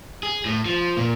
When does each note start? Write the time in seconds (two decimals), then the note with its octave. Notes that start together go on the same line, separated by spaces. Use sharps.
0.23 G#4
0.45 A2
0.66 F3
0.97 A#2